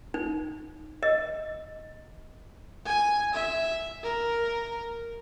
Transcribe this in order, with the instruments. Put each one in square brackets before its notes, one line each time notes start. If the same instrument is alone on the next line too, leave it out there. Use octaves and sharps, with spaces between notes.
[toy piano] D#4
D#5
[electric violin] G#5
E5
A#4